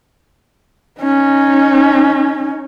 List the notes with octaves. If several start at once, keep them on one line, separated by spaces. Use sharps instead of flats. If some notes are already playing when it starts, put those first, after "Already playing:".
C#4 D#4